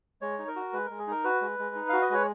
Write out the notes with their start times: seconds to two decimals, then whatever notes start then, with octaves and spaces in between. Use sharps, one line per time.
0.22 G#3 C#5
0.39 D#4
0.47 A#4
0.56 F#4
0.73 G#3 B4
0.86 G#3 A#4
0.99 G#4
1.07 D#4 A#4
1.24 F#4 B4
1.41 G#3
1.59 G#3
1.75 D#4
1.89 F#4 F5
2.02 D#5
2.10 G#3 C#5